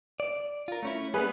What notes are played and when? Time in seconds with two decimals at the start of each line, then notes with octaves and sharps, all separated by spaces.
0.20 D5
0.68 F4 A#4
0.83 A3 C#4 E4
1.14 G3 A#3 B3 G#4 B4